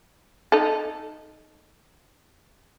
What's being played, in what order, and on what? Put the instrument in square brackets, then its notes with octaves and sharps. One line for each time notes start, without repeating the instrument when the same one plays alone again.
[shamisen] D#4 A4